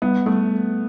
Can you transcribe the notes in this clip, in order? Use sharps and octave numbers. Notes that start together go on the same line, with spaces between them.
G3 B3
G3 A3